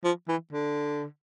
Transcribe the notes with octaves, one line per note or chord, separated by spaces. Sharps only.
F3
E3
D3